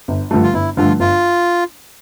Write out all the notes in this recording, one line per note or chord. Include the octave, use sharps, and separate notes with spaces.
G1
G2 D3 F3 A3
F4
G1 E4
G2 D3 F3 A3 F4
G1 F4